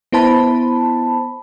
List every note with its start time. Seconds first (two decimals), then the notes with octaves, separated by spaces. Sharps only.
0.12 B3 E4 C5 A5 B5